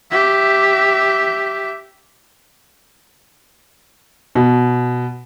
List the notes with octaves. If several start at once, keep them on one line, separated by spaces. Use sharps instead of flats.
G4 E5
B2